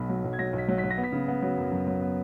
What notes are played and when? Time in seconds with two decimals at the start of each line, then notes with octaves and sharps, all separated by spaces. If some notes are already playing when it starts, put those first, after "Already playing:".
Already playing: B1 B2 B5
0.09 F#3
0.24 B1
0.33 G#6
0.39 F#3 A#6
0.53 B1 B6
0.68 F#3
0.78 B6
0.84 F#3
0.91 A#6
0.98 B3
1.04 B6
1.12 C#3
1.28 B3
1.42 F#3
1.57 F#2
1.72 F#2
1.87 F#3
2.01 B3